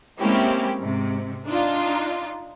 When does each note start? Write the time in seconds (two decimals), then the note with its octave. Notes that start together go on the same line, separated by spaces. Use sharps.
0.20 G#3 A#3 C4 C#4 E4 G4
0.79 G#2 C3
1.46 D4 D#4 F4